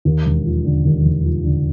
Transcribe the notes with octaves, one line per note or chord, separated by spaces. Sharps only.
D#2
E1
F3
D3
D#2
E1
F3
D3